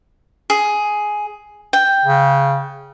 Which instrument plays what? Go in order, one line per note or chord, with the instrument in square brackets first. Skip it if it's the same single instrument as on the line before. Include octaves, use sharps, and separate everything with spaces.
[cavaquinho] G#4
G5
[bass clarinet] C#3